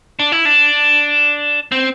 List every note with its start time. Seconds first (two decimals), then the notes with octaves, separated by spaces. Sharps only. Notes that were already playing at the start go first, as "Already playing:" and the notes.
0.19 D4
0.32 E4
0.45 D4
1.72 C4